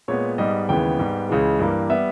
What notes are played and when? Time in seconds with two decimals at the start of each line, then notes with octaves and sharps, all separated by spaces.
0.08 A#2 G#3 B3 C#5
0.38 G#2 G3 B3 D#5
0.68 D#2 C#3 E3 G#3 B3 G5
0.99 G#2 G3 B3
1.29 C#2 C#3 E3 G#3
1.59 G2 E3 G3 A#3
1.90 G3 B3 E5